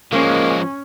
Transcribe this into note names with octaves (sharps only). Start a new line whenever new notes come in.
F3 G#3 A#3 C#4